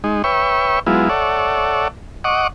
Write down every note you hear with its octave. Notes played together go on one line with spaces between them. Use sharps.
G#3 D#4
B4 C#5 E5 G5 C#6
F#3 G#3 B3 E4 F4
A4 C#5 D5 E5 F#5
D#5 F#5 C#6 D6